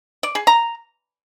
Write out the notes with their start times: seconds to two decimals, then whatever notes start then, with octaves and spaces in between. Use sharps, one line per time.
0.23 D5
0.35 G#4
0.47 A#5